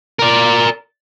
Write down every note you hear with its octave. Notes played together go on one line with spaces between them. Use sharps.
A#4 D5